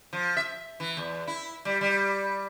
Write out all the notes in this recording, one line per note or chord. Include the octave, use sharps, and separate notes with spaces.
F3
E5
E3
E2
E4
G3
G3